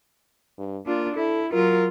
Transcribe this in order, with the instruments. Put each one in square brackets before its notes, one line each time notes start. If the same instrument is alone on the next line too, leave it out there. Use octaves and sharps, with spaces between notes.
[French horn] G2
[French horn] A#3 [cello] D4 F4
[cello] E4 [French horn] A4
[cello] F#3 F4 [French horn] A#4